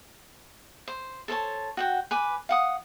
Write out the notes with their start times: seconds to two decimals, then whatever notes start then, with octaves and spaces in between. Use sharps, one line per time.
0.88 C5
1.28 A4 C5 C#5 A5
1.77 F#4 F#5 G5
2.11 B4 G#5 D6
2.49 F5 F#5 D#6